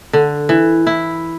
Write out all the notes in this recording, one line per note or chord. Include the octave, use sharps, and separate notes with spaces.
D3
E3
E4